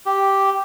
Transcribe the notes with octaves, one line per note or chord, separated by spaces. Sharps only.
G4